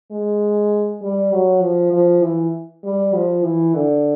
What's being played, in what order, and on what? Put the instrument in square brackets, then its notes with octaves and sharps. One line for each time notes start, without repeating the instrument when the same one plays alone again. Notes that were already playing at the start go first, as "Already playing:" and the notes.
[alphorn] G#3
G3
F#3
F3
F3
E3
G3
F3
E3
D3